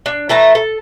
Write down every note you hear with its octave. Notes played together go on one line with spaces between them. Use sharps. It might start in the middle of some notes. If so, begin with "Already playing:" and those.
D4
E3 A3 A5 A#5
A4